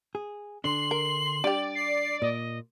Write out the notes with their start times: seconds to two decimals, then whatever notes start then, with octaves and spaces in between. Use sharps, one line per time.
0.15 G#4
0.64 D3 D4 C6 F#7
0.91 A#4
1.44 G3 D4 G4 D5
1.75 C7
2.22 A#2 D#5